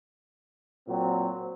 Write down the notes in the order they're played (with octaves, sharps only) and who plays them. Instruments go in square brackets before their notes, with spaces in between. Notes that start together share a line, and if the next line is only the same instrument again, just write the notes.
[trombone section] A#2 F#3 C4